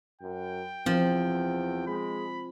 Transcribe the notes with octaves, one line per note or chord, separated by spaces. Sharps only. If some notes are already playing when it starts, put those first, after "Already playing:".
F#2 G5
E2 F3 C4
G#3 B5